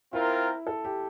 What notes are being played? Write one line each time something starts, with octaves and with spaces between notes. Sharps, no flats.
C4 E4 F4 A#4
A4
G4